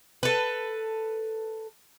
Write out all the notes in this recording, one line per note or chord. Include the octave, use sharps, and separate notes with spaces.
A4 B4